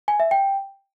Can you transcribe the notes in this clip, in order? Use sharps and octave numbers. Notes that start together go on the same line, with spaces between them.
G#5
E5
G5